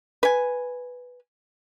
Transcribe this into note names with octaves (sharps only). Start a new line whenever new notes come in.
B4 G#5